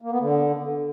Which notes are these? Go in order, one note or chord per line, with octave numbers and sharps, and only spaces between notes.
A#3
B3
D3